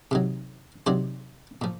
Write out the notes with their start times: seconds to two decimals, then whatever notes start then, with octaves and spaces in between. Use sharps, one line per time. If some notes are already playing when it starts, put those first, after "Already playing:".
0.11 C3 D#3 F#3
0.86 C3 D#3 F#3 C5 D5
1.62 A#2 F3